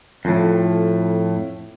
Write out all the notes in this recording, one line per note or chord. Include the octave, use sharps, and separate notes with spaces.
F2 A2